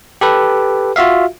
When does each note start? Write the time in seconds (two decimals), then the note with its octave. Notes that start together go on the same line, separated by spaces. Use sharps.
0.21 G4 A4 B4
0.96 F4 F#4 E5 F5